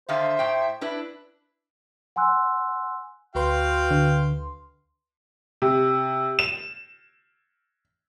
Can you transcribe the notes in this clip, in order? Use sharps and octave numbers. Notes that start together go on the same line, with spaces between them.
D3 D#3 C5 E5 F5
A2 G5
D4 E4 B4
F#5 G#5 C6 E6 F#6
D2 F#4 B4 F5 G5 C6
D3
C3
E7